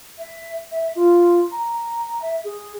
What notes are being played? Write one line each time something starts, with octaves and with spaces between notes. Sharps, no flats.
E5
E5
F4
A#5
E5
G#4